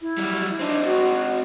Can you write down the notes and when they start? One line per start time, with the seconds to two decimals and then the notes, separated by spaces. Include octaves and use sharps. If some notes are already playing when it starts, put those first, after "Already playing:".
0.01 E4
0.17 F#3 G3
0.59 C4 D4 D#4
0.85 F#4